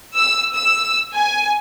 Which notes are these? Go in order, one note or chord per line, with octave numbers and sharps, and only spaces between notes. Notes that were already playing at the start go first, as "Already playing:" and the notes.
E6
E6
G#5